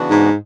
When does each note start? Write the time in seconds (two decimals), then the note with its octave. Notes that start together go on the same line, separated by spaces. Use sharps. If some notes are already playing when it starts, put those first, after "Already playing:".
Already playing: C#3 E3 B3 D4 F#4
0.11 G#2